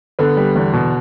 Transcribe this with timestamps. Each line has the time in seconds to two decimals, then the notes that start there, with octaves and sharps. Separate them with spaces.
0.19 D3 B3
0.37 G3
0.56 E2
0.73 B2